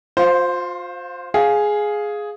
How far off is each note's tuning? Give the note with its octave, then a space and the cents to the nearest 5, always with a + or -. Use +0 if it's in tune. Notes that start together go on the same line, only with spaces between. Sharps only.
F4 +35 C5 +0 F5 +0
G#4 +5 F5 +5